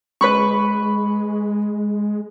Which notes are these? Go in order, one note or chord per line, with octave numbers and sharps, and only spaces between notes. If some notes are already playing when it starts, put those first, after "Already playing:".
G#3 B4 B5 C#6